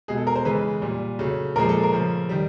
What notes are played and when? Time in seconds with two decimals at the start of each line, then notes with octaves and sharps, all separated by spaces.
0.08 B2 G#3 G#4
0.18 A4
0.27 A#4
0.35 C5
0.45 C#3 E3 G#3 B4
0.82 A#2 G3
1.19 C#3 F#3 A3
1.56 A#2 F3 G#3 A#4
1.69 A4
1.83 A#4
1.93 C#3 F3 A3
2.29 D#3 G3